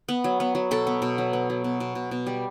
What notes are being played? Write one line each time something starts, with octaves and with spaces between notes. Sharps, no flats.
B3
F#3
B3
F#3
B2 A4
B3
B2
F#3
B3
F#3
B2
B2
B2
B2
G3